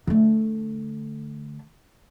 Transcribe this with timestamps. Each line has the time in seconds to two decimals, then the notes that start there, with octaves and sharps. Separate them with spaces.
0.07 D3 A3